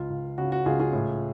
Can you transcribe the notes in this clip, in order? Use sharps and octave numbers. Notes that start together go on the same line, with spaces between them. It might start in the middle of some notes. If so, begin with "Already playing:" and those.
Already playing: C#2 F4
C#2
C#3 F#4
F#4
C#2 F4 G#4
F4 G#4
A2